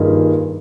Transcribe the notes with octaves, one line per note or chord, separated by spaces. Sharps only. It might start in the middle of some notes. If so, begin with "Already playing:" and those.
Already playing: G2 D#3 A#3 F4 G#4